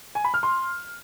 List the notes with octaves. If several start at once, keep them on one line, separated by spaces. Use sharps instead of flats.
G#5
B5
F6
C6